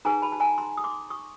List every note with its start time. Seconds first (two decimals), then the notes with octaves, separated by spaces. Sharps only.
0.05 D#4 G#4 B4 G#5 A#5
0.22 A5 B5
0.32 A5
0.40 G#5 A#5
0.58 A#5 C6
0.77 D#6
0.84 C6 D6
1.10 C#6 D#6